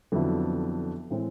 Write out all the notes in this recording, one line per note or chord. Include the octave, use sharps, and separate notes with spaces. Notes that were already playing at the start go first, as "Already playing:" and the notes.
F2 D3 F#3 B3 E4
A2 E3 G#3 C4